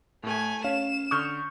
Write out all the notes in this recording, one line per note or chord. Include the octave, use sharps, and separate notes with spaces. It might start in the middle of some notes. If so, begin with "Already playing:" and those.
A2 A3 G#5
C#4 F5 E7
D3 C#6 D#6 F6 G6